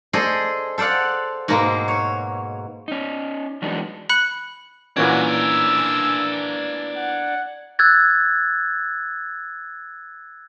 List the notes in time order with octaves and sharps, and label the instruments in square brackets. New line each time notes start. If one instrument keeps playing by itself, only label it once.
[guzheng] G#4 A4 C5 D5 D#5
A4 C5 D5 F5 F#5
G#2 B2 G#3 A#3 B3
C#5
[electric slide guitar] C#4 D#4
E3 F#3 G#3 B3 D4 D#4
[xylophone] B5 F#6 C#7
[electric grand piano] A#2 E3 C#4 [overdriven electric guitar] D4 A#4 [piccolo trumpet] F#4 [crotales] G#6
[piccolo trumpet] E6
F#5
[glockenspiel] E6 F#6 G#6 A6